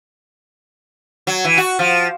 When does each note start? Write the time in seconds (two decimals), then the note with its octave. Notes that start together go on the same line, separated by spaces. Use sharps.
1.27 F#3
1.45 E3
1.58 F#4
1.79 F3